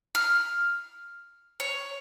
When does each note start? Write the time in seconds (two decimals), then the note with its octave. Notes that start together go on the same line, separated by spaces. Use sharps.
0.15 F6
1.60 C#5